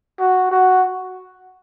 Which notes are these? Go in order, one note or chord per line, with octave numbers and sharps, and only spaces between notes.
F#4
F#4